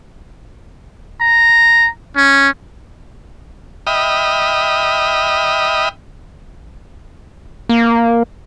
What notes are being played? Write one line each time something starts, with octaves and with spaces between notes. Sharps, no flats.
A#5
C#4
D#5 E5 G5 B5 D#6 F6
A#3